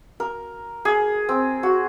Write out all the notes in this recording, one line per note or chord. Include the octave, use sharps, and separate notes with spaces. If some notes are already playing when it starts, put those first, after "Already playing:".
A#4
G#4
C4
F#4